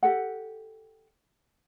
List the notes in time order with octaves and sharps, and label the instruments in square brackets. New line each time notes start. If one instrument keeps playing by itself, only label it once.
[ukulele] G4 A4 F#5